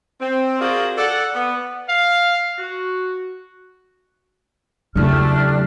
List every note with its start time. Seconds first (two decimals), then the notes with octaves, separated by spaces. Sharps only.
0.21 C4
0.60 F4 F#4 G#4 A#4 C5 D5
0.98 A4 D5 F#5
1.34 B3
1.89 F5
2.58 F#4
4.96 E2 C#3 F#3 A3 D4 G4 F6